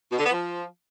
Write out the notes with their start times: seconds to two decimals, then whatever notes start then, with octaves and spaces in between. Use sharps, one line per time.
0.12 B2
0.18 D3
0.25 B3
0.31 F3